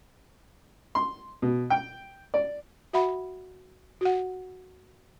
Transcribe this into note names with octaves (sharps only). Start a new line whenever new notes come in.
C6
B2
G5
D5
F#4 E5 F#5 B5
F#4 F#5